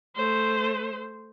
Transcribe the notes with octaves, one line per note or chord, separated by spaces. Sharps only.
A3 C5